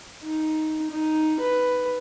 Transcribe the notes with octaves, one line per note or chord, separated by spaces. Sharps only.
D#4
D#4
B4